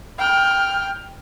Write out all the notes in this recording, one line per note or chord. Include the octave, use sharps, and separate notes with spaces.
G5 F6